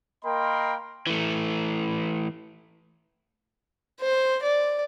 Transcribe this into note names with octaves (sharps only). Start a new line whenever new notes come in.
A#3 A#4 D#5 G5 B5 C6
E3 A3
C5
D5